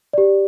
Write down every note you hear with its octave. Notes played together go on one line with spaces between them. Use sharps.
G4 D5